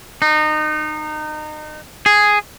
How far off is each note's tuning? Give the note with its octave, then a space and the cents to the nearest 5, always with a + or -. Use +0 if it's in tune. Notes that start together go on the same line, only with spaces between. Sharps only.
D#4 -25
G#4 +0